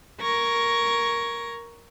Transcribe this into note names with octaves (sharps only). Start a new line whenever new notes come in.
A#4 C#6 G#6 A#6